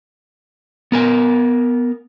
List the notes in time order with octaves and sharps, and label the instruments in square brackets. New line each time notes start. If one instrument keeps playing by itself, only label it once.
[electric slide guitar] B3 A#4 G#5